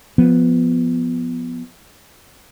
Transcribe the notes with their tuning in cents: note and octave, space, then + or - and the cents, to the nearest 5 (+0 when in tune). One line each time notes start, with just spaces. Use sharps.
F3 +0 B3 +0